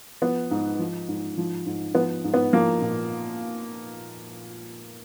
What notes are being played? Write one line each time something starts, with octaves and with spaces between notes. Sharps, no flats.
F3 B3
G#2
F3
G#2
F3
G#2
F3 B3
G#2
B3
F3 A#3
A#2